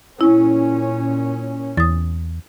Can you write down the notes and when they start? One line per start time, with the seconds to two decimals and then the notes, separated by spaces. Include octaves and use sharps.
0.21 A#2 C#4 E4
1.77 E2 D#6 A6